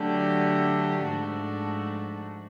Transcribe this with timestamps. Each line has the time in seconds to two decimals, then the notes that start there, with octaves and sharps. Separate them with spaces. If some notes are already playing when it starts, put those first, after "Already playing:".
Already playing: D3 F#3 A3 D4 G4
1.05 G#2 F3 A3 D4 F#4